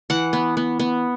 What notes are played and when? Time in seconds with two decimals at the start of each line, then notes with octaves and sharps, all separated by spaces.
0.10 E3 F#5
0.33 B3
0.57 B3
0.79 B3